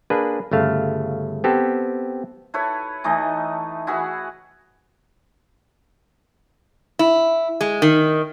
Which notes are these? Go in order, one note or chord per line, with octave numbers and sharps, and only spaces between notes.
A#3 D4 G#4 B4
G1 C#3 A3 F5
B3 C4 G4 A4
E4 A4 B4 C#5
E3 A3 D#4 D#5
E4 F#4 G#4 B4
E4
G#3
D#3